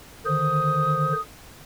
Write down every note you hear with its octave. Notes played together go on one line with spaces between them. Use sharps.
D3 D#3 C5 D#6